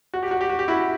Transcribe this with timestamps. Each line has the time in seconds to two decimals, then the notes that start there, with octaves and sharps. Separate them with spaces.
0.14 F#4
0.23 G4
0.31 F#4
0.41 G4
0.49 F#4
0.59 G4
0.68 E4 F#4